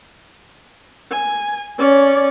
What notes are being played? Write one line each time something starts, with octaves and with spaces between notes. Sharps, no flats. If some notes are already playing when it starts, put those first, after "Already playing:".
G#5
C#4 D5